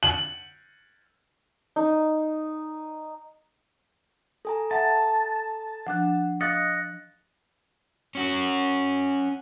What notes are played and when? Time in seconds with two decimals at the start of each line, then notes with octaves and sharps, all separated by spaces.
0.03 F#7
1.76 D#4
4.45 A4 G#5 A#5
4.71 E5 F#5 A5
5.87 F3 D4 F#5 F#6
6.41 D#5 F5 F#6 A6 C#7
8.15 C#4 F#4